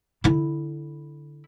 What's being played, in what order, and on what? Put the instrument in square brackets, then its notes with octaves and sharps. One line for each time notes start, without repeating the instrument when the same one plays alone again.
[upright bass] D3 E4